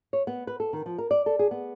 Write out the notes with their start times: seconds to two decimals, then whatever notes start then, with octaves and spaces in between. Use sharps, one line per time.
0.13 C#5
0.27 B3
0.47 B4
0.60 A4
0.73 D#3
0.86 F3
0.98 A#4
1.11 D5
1.26 A4
1.39 G#4
1.51 B3